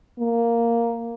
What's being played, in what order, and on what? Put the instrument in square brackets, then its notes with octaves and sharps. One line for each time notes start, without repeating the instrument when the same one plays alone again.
[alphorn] A#3